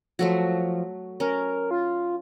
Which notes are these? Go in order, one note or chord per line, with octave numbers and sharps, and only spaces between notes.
F3 F#3 A3 F#4
C#4 A#4
F4